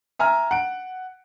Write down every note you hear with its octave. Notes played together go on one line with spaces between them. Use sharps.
E5 G#5 A#5 F6
F#5 D7